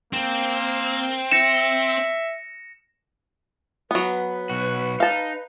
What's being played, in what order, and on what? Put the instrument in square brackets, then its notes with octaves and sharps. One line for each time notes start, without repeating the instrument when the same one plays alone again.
[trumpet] A#3 [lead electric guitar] C4
[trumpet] E5 [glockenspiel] A#6 C#7 E7
[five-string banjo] F#3 B3 [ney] B4
[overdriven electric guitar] B1 F#4
[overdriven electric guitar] D#4 [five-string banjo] F5 A5